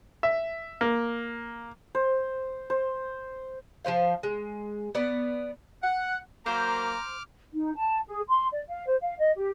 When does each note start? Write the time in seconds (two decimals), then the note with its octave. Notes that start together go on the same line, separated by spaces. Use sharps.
0.23 E5
0.81 A#3
1.95 C5
2.70 C5
3.85 F3 B3 C5 F5
4.23 G#3
4.95 B3 D5
5.83 F#5
6.46 F#3 A#3 C5 A#5 D6 F6
7.54 D#4
7.76 A5
8.08 G#4
8.28 C6
8.52 D5
8.68 F5
8.87 C5
9.00 F5
9.19 D#5
9.36 G4